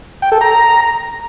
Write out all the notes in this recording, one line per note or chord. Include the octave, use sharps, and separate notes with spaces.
G5
A4
A#5